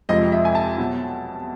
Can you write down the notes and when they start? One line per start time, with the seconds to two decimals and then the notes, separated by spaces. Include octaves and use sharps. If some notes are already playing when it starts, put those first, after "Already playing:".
0.09 F2 C3 F3 G#3 D#5
0.32 E5
0.45 G#5
0.55 A5
0.78 B2 F#3